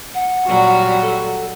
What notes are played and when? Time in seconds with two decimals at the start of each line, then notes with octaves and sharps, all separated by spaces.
0.14 F#5
0.47 A#2 F#3 G3 F#4
1.02 A4